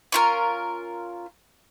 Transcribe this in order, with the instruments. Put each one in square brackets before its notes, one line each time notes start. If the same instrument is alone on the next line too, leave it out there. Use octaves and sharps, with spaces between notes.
[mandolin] C#4 F4 A#4